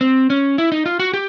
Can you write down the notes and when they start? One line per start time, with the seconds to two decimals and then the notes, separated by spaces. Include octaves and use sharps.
0.01 C4
0.30 C#4
0.58 E4
0.72 D#4
0.86 F4
1.00 F#4
1.14 G4